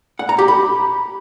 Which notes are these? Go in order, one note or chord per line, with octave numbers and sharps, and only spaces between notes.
F#5
A#5
G4
B5